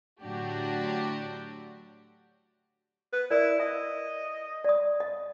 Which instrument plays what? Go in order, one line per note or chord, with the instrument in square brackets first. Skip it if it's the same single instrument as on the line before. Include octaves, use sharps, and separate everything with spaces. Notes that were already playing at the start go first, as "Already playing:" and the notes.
[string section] A2 D3 F#3 D4 F#4 G4
[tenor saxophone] B4
[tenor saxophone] E4 [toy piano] A#4 D5
[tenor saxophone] D#5 [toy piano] E5
[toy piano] D5 D#6
D#5